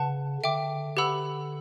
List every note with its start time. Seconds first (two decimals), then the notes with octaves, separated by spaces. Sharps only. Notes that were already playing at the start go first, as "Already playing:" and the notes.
Already playing: C#3 B4 F#5 A5
0.43 D3 E5 G5 D6
0.97 G4 B4 F#5 B5 E6